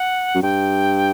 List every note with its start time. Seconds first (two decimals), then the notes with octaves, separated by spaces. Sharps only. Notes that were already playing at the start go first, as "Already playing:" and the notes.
Already playing: F#5
0.35 F#2
0.42 G2 G5